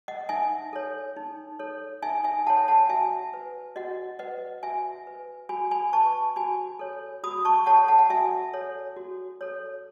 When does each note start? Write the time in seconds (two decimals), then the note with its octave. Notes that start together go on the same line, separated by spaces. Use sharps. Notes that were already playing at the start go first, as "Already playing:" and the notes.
0.08 D#5 F#5
0.29 D#4 E5 G#5
0.73 A4 C#5
1.16 D#4
1.59 A4 C#5
2.02 D#4 E5 G#5
2.24 E5 G#5
2.47 A4 C#5 F#5 A5
2.68 F#5 A5
2.89 F#4 E5 G#5
3.34 B4
3.76 F#4 D#5 F#5
4.19 B4 D#5 F#5
4.63 F#4 E5 G#5
5.07 B4
5.49 F#4 G#5 B5
5.71 G#5 B5
5.93 B4 A5 C#6
6.36 F#4 G#5 B5
6.79 A4 C#5
7.23 F#4 B5 D#6
7.45 A5 C#6
7.66 A4 C#5 F#5 A5
7.88 F#5 A5
7.99 F#5
8.10 F#4 E5 G#5
8.53 A4 C#5
8.97 F#4
9.41 A4 C#5